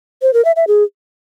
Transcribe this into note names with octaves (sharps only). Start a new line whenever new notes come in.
C5
A#4
E5
E5
G#4